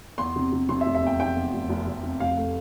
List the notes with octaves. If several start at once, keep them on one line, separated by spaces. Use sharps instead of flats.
E2 C6
C3
C3
C3 C6
E5
F1
E5
E2 G5
E2 G5
E2
F1
F1
F1
C3
F1 F5
A3